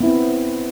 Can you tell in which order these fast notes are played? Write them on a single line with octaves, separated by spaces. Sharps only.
B3 E4 C4